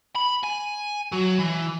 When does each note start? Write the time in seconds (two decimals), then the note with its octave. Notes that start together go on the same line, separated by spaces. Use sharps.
0.15 B5
0.43 G#5
1.12 F#3
1.39 E3